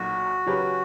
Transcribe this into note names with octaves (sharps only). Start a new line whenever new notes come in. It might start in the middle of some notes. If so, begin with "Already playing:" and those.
Already playing: B1 A#2 F#3 F#4
C#3 F#3 C#4 G4 B4